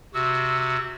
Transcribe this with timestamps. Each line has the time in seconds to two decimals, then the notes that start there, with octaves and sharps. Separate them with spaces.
0.14 C3 F#4 E6